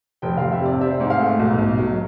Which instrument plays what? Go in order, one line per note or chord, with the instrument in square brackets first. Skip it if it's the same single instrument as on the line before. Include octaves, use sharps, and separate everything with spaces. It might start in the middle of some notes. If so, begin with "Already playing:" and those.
[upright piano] F1 G5
F1 F5
E5
C3 D5
C4 E5
G#2
F5
A3
B1
B1
F#3